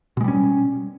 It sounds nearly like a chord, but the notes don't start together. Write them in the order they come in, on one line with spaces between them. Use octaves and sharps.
B2 G#3 G3 C#4